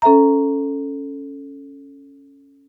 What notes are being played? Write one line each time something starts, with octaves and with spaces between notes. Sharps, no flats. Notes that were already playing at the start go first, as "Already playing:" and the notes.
C#4 A4 C5 E5 A#5